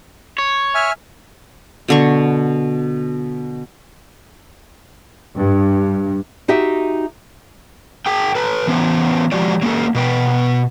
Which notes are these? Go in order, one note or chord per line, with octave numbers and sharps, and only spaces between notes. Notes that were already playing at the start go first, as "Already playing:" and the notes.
C#5
E5 G#5 F6
B2 D3 C#6
G2
D#4 F#4 G4 E5
G#4 G5
A4 B4
E3 B3 C#4 C5
F3 G#3 F#4 G4 D5
F#3 A#3 C#4 A4
B2 B4 G5